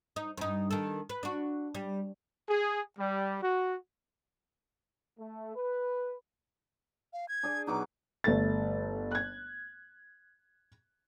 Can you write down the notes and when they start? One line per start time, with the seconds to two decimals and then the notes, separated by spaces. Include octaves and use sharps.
0.16 D#4
0.37 G2 D#4
0.71 D#3 A4
1.10 B4
1.23 D4 F#4
1.75 G3
2.49 G#4
2.99 G3
3.43 F#4
5.19 A3
5.56 B4
7.13 F5
7.29 G#6
7.43 D4 G#4 D5
7.67 B2 F#3 D#4 D6
8.24 G1 A3 A4 A6
9.11 F#6 G#6